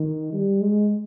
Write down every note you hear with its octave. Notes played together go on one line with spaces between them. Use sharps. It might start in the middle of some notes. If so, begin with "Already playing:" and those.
Already playing: D#3
G3
G#3